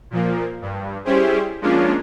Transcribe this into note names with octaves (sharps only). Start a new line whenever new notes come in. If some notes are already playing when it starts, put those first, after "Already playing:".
A#2 F3 A#3
G2
G3 C#4 E4 G4 G#4 C5
F3 G#3 A#3 C#4 D4 F4